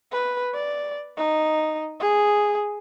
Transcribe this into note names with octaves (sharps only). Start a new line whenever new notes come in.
B4
D5
D#4
G#4